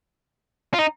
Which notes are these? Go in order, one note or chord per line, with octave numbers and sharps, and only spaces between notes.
F4
D#4